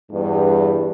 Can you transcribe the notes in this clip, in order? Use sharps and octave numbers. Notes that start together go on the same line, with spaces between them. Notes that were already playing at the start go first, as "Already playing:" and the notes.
E2 G2